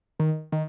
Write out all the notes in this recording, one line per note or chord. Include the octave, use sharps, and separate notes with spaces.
D#3
D#3